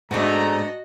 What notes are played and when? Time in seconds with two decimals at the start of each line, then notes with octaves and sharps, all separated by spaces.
0.11 G#2 A3 B3 C4 D4 F#4 D#5 A#5